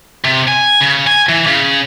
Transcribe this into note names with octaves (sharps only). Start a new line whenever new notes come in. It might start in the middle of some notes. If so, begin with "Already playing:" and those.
C3
G#5
C#3
G#5
E3
C#3